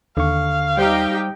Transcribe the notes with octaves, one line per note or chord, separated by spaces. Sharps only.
D#2 D3 F5 C#6
G3 D#4 G4 C5 G5